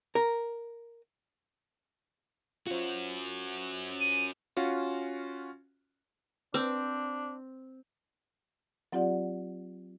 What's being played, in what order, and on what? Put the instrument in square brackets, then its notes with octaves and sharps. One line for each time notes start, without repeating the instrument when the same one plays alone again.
[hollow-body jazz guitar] A#4
[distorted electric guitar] C#4 F#4 [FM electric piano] F4 C5
[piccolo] D#7
[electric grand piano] C#4 F4 F#4
[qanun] C4 [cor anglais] D4
[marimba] F#3 C4 F4 G4 D5 F#5